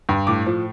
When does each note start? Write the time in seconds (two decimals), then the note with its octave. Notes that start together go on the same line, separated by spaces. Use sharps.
0.09 G2
0.27 A2 D6
0.46 F3